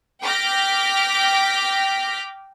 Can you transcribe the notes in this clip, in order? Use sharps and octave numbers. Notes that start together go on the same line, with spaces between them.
G5 D6 F6 G6 A#6 B6